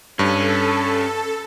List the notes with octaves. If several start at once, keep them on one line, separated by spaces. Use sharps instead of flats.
G2 C#4 A4